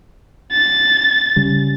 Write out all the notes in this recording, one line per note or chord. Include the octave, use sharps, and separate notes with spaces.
A6
C#3 G3